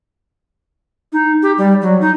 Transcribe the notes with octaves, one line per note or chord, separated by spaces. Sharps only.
D#4
G4
G3
F#3
D#4